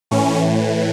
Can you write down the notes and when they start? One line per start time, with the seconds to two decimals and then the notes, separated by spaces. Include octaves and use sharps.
0.11 A2 E3 C#4